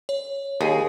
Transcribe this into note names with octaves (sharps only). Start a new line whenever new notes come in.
C#5
D#2 G#4